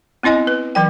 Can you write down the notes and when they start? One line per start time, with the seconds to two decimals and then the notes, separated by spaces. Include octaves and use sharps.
0.23 B3 C4 E4 D#5 G#5
0.47 B4
0.75 E3 F#3 G5